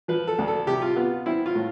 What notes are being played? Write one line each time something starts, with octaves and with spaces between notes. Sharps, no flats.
F3 B4
A4
D2
A4
C3 G4
F4
B3 F4
C4 E4
F4
A2